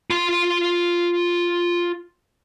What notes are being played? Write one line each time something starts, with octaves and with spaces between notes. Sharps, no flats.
F4 C6